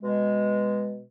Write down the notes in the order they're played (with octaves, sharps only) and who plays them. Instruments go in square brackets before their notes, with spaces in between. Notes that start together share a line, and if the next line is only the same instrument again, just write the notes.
[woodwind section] B2 G#3